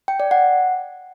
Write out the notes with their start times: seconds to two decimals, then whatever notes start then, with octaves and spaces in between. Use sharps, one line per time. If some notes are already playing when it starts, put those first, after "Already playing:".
0.08 G5
0.20 D5
0.31 F#5